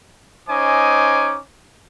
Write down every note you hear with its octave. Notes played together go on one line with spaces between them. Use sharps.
C#4 D#4 C5 D#5 G#5 D6